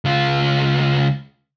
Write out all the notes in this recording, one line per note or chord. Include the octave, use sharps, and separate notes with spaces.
C#2 F4